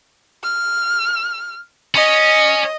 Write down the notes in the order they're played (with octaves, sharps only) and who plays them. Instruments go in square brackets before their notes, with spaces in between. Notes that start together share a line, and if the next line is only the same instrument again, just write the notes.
[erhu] F6
[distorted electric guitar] C#4 [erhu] D#5